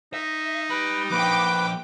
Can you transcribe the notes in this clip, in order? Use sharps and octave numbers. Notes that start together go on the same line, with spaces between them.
D#4 E5
G4 B4 B5
F3 A#3 B4 G5 D6